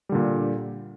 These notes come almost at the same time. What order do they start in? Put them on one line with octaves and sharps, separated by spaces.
G3 D3 A#2